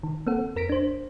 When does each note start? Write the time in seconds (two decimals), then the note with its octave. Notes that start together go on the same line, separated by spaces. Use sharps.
0.03 D#3
0.27 A#3 C4 A4 F#5
0.56 F2 A#4 A#6 B6 D7
0.69 D4 C5